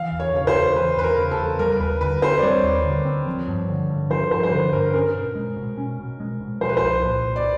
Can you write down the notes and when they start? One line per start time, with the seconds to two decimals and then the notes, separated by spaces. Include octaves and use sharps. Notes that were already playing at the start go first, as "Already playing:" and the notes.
Already playing: E3 F5
0.12 E2
0.20 C#5
0.34 C#3 C#5
0.47 C5
0.54 E2
0.75 E3 B4
0.97 E2 B4
1.04 A#4
1.17 C#3
1.31 A4
1.38 E2
1.59 G3 A#4
1.80 D#2 B4
2.01 D3 B4
2.22 C4 C5
2.38 D5
2.42 G3 C#5
2.63 D#2
2.84 D3
3.05 C4
3.27 F3
3.48 G2
3.69 D3
3.89 G2
4.10 F3 C5
4.31 G2 C5
4.43 C5
4.51 D3 B4
4.72 G2 A#4
4.94 C#4 A#4
5.15 B2
5.35 G#3
5.56 B2
5.77 C#4
5.99 B2
6.20 G#3
6.41 B2
6.61 F3 C5
6.69 B4
6.77 C5
6.82 C2
7.03 A#2
7.23 C2
7.36 D5